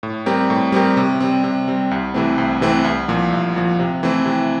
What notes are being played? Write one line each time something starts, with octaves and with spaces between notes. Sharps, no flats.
A2
G3 C4 G4 A#4
A2
G3 C4 G4 A#4
C3
G3 C4
C3
G3 C4
C2
C3 E3 A3 C4
C2
C3 E3 A3 C4
C2
A#2 F3
C2
A#2 F3
C3
E3 A3 C4 E4
C3